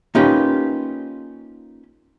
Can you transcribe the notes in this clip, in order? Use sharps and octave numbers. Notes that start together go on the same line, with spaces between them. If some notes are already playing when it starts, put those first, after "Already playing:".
A#3 C#4 D#4 F4 G4 B4